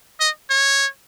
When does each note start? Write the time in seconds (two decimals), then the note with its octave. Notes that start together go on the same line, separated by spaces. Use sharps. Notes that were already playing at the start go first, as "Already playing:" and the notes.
0.20 D#5
0.50 C#5